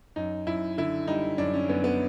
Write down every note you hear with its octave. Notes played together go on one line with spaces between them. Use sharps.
F#2 D#4
F#2 E4
D3 E4
G3 D#4
F#2 D4
C#4
F#2 B3
B3